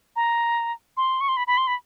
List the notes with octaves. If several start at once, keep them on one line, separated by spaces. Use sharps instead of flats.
A#5
C6
C#6
C6
B5
B5
C6
B5